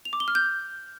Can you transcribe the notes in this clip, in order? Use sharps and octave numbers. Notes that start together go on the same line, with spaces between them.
F7
D6
G7
F6
G6